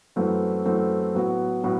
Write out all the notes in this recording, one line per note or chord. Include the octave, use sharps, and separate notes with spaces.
F#2 E3 A3 C4 F#4
F#2 E3 A3 C4 F#4
A2 F#3 B3 F#4
A2 F#3 B3 F#4